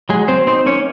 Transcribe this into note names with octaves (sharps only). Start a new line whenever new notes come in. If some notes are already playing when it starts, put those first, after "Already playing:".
F#3 G#3 G#4
F#3 C4 C5
C4 D#4 C5
A#3 C#4 C#5